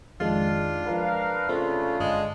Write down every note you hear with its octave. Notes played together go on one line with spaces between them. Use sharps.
F2 D#3 G#3 D4 F4
F3 G#3 A#4 B4 F5
C#3 A3 C4 F4
G1 G#3